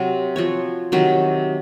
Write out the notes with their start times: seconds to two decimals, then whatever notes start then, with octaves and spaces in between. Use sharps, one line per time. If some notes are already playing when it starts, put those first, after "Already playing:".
Already playing: C3 F#3 C4
0.36 F3 C4 F#4 C#5
0.92 C3 D#3 F#3